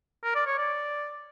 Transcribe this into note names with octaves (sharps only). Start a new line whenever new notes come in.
A#4
D5
C#5
D5